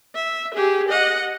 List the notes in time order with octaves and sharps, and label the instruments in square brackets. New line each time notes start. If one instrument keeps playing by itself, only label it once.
[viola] E5
G4 G#4
D#5 F#5